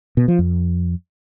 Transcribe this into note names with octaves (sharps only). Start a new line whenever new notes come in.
B2
F3
F2